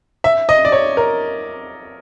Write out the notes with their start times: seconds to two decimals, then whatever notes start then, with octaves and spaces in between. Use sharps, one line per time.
0.24 E5
0.49 D#5
0.65 D5
0.72 C#5
0.97 A#4